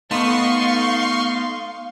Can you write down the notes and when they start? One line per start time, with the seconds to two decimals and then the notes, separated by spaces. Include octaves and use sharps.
0.11 A3 B3 D#4 F5 C6 C#6